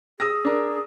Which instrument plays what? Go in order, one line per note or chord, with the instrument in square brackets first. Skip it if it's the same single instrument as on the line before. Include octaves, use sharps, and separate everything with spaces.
[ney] G#4 [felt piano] D#6 E6 A#6
[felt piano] D4 A#4